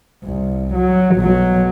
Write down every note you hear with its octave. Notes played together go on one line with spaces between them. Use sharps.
C2
F#3
B1 F#3